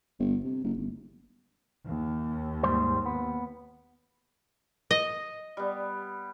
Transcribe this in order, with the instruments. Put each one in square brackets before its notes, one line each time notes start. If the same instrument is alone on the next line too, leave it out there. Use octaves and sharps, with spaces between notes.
[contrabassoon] G1
C3
F#1
G1
[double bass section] D#2
[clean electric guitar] G#2 G3 C5
B3
[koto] D#5
[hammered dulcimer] G3 B3